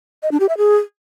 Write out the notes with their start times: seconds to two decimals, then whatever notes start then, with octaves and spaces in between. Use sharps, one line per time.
0.23 D#5
0.31 D4
0.40 G4
0.49 E5
0.57 G#4